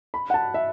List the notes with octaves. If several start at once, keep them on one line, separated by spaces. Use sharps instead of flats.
B5
F#5
A5
E5